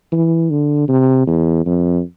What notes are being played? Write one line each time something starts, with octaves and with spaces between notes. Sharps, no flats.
E3
D3
C3
E2
F2